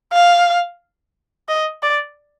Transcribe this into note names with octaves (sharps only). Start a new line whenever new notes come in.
F5
D#5
D5